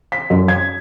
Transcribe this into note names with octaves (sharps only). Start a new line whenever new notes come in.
B6
F#2
G#6